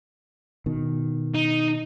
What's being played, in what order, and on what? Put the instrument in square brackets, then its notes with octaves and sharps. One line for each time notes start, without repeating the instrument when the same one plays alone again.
[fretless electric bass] B2 D#3
[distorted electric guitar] D#4